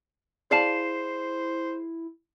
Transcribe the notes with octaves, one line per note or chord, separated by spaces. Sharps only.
E4 G#4 C5 D5 F5 A5 C7 E7